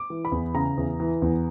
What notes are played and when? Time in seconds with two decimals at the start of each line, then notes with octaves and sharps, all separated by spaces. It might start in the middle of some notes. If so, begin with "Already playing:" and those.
Already playing: D6
0.10 E3
0.25 B5
0.32 E2
0.54 C#3 A#5
0.78 E2
1.00 E3
1.22 E2